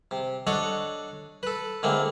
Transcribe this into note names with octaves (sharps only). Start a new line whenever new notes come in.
C3
D4 A4 C#5 D#5 F#5
A4 B4
D3 G#3 A#3 C4 E4